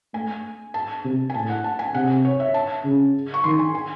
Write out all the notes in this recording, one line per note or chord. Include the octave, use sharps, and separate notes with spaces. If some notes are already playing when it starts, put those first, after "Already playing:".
A3 G#5
A5
C3
G#5
A2 A5
F#5
A5
G#5
C3 F#5
C#5
E5
A5
C#3
C#6
D#3 C6
G#5
G#5